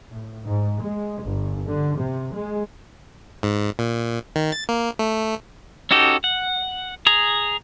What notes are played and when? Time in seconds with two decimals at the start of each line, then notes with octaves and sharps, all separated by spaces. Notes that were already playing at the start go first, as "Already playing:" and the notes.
0.11 A2
0.46 G#2
0.81 G#3
1.21 G1
1.67 D3
1.98 C3
2.33 G#3
3.43 G#2
3.79 A#2
4.36 D#3
4.52 A6
4.69 A#3
4.99 A3
5.91 C#4 D#4 F#4 G4 A4
6.24 F#5
7.07 G#4 A#5